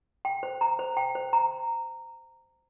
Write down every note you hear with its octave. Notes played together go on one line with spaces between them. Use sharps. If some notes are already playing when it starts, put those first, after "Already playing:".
G5
C5
A#5
C5
G5
C5
A#5